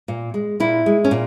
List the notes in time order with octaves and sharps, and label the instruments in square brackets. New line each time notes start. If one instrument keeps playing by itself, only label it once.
[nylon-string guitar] A#2
G#3
A#2 E4
G#3
C#4
A#2